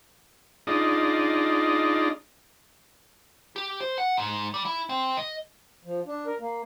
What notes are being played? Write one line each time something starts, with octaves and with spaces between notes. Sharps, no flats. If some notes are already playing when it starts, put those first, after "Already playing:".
D4 D#4 F4 G#4 D5 D#5
G4
C5
F#5
G#2
G3
E4
C4
D#5
F3
D4
A#4
A#3